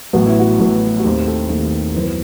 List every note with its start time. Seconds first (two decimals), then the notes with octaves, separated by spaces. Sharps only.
0.13 A1 A2 F#3 B3 F#4
0.26 E4
0.40 F#4
0.59 A1 A2 F#3 B3
0.99 F#4
1.04 D#2 D#3 A3 C4 G4
1.27 A4
1.49 D#2 D#3 A3 C4 A4
1.94 F#2 E3 B3 C5
2.03 B4